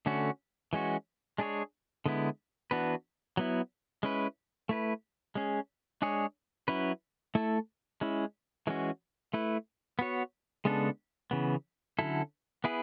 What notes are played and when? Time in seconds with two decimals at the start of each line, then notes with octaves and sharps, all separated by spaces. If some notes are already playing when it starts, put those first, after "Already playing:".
0.06 D3 A3 C#4 F#4
0.73 E3 G#3 C#4 F#4
1.38 G#3 D4 G#4 C#5
2.06 D3 G#3 B3 E4
2.71 E3 B3 D4 F#4 B4
3.37 F#3 B3 E4
4.03 G#3 C#4 E4 B4
4.69 A3 E4 B4
5.35 G#3 C#4 G#4
6.02 G#3 D4 G#4 C#5
6.68 F#3 C#4 E4 B4
7.35 A3 E4 A4
8.01 G#3 C#4 E4
8.67 E3 G#3 C#4 F#4
9.33 A3 E4 B4
9.99 B3 F#4 C#5
10.65 C#3 G#3 B3 D4 A4
11.31 C#3 E3 B3
11.99 D3 F#3 C#4 E4 A4
12.64 B3 E4 G#4 B4